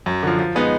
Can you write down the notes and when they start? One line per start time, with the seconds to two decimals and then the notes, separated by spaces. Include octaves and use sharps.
0.06 F#2
0.23 D3 F3
0.39 F3
0.55 G#3 B3 D#4